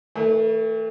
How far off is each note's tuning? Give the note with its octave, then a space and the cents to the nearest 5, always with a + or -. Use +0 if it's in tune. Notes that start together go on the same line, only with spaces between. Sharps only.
E3 -40 A3 +15